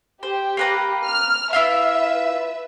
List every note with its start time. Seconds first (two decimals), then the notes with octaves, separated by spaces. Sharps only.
0.23 G4 C5
0.57 A#3 B4 A#5
1.04 F6
1.53 E4 F4 B4 E5 F5